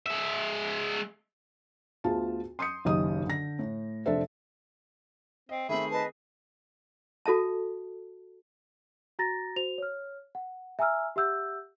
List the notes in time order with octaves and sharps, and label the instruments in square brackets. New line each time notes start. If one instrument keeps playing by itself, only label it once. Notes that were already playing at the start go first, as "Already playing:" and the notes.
[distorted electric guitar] G#3 E5
[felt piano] D2 B3 F4 G#4 A5
C6 D#6 G6 C#7
F#1 B1 D#3 G4 D#5 D#6
D3 A#6
A2
F1 D4 A4 C5 E5
[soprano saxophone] C4 [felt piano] D#5
[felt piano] D#3 A3 C4 [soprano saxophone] G#4 [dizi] E5 [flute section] B5
[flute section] B4 D#5 [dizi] A5
[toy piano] F#4 A4 E5 A5
[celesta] F#4 A#5 A6 A#6
F#4 C5 F7
C#5 F6
F#5
E5 G#5 A#5 E6 F6
G4 E5 F#5 E6 G6